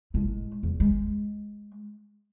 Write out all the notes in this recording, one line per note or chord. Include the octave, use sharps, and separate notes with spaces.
A2 G#3
E2
G#3